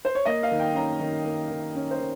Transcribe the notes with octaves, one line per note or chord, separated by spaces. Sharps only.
C5
C#5
A#3 D#5
F5
D#3
G5
C#4 A#5
D#3
A#3
D#3
C#4
C5
D#3